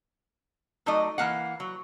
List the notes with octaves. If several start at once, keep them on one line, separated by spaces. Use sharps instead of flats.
F#3 A3 D#4 D5 D#5
E3 A#3 F5 F#5
F#3